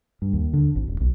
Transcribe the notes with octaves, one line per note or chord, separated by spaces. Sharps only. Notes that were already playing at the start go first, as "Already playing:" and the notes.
G2
D#2
D3
G#1
D#1
B1